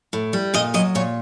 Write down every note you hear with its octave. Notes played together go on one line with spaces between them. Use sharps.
A2
G3
A#2 D#5
F#3 D#5
A#2 C#5